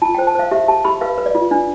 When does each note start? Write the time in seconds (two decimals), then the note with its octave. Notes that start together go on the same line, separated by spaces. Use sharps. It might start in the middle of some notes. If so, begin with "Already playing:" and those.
0.02 F4 A5
0.15 G5
0.18 C5
0.27 A5
0.35 C5 F5
0.51 G4 E5
0.68 G4 A5
0.85 G4 B5
1.01 B4 F5
1.18 B4
1.26 D5
1.35 F4
1.51 D4